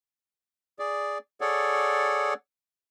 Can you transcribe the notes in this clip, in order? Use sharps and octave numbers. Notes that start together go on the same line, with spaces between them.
G#4 D5
G#4 A4 C#5 D5 F#5